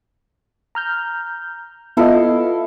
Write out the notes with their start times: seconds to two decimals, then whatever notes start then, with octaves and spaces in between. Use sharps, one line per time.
0.75 A#5 F6 G6
1.97 B3 E4 F4 A4 D#5 F5